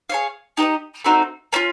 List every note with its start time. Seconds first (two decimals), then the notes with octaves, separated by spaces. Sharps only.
0.10 G#4 C#5 F5
0.57 D#4 G4 B4 D#5
1.04 A3 C4 D#4 F#4
1.53 A#3 C#4 F4